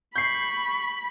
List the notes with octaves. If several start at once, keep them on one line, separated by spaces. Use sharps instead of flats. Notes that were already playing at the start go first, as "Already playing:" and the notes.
B5 C#6 G6 C7